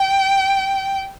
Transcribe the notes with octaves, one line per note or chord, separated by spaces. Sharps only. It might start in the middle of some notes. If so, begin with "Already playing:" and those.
Already playing: G5